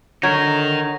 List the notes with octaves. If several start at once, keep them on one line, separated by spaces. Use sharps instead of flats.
D3 F#3 D#4 A#4 G#6